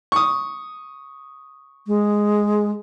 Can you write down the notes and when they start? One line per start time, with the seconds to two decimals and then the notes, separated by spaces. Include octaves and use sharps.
0.12 C#6 D#6
1.87 G#3